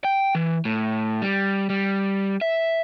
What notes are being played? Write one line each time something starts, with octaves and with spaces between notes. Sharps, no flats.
G5
E3
A2
G3
G3
E5